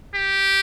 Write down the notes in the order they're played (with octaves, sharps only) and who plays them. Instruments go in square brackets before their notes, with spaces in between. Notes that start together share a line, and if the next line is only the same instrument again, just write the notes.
[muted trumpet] G4